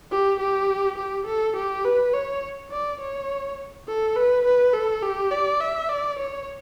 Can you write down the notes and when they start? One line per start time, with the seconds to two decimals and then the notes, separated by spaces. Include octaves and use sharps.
0.11 G4
0.40 G4
0.98 G4
1.26 A4
1.56 G4
1.84 B4
2.13 C#5
2.71 D5
3.01 C#5
3.87 A4
4.16 B4
4.45 B4
4.73 A4
5.02 G4
5.31 D5
5.60 E5
5.89 D5
6.19 C#5